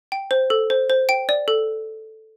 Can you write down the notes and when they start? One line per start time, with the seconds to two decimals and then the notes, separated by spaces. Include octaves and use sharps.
0.12 G5
0.31 C5
0.50 A4
0.70 C5
0.90 C5
1.09 G5 D7
1.29 D5
1.48 A4